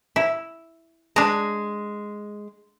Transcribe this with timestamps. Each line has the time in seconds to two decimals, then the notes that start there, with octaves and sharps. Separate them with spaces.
0.16 E4
1.16 G#3 D4 A#5